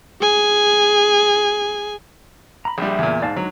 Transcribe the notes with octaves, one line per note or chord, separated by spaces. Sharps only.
G#4 G#5
A#5 B5
A#1 G3 G#4 E5
E2 A#2
G#2 D5 F5 A5
D3 F#3 G#3 D#4